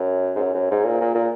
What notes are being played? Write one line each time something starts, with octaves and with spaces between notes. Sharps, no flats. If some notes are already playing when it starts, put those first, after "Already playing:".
Already playing: F#2
G#2
F#2
F#2
G#2
A#2
A#2
A#2